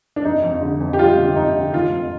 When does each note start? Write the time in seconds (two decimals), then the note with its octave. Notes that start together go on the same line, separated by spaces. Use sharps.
0.16 D4
0.24 F2 D#4
0.42 F2
0.61 D3
0.80 F2
0.93 G4
0.98 G3 F4
1.18 D3
1.36 F2 D#4
1.55 D3
1.74 D#3 F4
1.92 F2